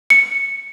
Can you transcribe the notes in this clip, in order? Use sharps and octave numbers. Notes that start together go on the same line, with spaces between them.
C#7